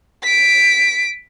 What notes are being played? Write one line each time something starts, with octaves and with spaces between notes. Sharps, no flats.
B6 D7